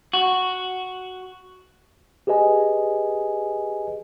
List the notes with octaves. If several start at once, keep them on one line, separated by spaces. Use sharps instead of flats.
F#4
G4 G#4 B4 D#5 G#5